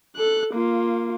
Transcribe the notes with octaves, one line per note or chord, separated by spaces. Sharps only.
A4 F#6
A#3 F4